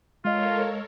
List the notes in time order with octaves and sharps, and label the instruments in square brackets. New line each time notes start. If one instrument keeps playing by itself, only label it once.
[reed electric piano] G#3 D#5 [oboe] F4 [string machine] A4 A#4 C#5 [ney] F5